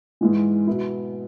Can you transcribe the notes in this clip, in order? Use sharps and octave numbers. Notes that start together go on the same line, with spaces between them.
G#2 E3 G#3
B2 B3 E4